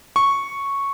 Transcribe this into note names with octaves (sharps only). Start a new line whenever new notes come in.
C#6